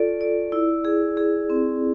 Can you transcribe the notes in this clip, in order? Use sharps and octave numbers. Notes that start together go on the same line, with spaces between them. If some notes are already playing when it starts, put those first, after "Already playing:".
Already playing: F4 A4 D5
D5
E4
G#4
G#4
C4